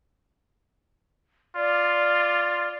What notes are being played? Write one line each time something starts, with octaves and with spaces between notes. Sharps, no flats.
F4 D5